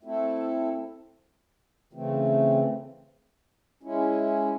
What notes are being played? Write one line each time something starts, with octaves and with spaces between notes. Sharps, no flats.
A3 C4 E4 A4
C#3 E3 A3 C4
G#3 C#4 E4